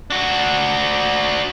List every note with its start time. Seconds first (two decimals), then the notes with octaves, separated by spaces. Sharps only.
0.10 D4 F#4